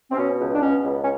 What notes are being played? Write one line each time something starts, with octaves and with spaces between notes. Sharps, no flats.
C4
B2 C#4
C#2
D4
B2 C#4
C#2
C#4